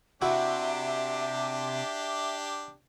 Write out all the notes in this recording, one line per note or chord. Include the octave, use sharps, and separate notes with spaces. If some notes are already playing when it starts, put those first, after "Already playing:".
C3 D4 E4 F#4 G4 E5